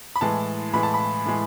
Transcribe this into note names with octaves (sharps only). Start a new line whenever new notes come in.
B5
A2 E3 G#3 A5
A2 E3 G#3 B5
A5
B5
A2 E3 G#3